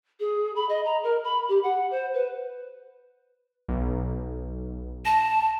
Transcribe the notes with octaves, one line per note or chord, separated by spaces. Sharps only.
G#4
B5
D#5
A#5
A#4
B5
G4
F#5
C5
B4
B1
A5 A#6